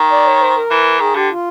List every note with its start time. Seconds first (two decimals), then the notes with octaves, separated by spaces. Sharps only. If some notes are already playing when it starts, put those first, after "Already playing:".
Already playing: D#3
0.12 D5
0.26 C#5
0.41 C5
0.56 A#4
0.71 E3
1.00 D#3 G#4
1.15 D3 G4
1.30 F4